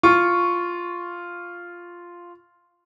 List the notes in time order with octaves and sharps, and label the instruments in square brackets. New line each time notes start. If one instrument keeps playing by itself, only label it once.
[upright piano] F4 C#6